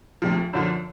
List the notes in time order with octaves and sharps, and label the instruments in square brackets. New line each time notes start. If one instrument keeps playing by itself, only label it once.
[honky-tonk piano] D2 C3 F3
F#2 D3 F3